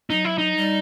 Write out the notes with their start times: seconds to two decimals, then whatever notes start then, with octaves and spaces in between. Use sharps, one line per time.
0.10 F#3 D#4
0.25 E4
0.38 D#4
0.57 G3